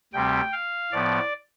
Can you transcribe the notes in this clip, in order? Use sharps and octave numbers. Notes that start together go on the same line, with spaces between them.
D2 C3 G3 C4 G5
F5
A2 F3 B3 D5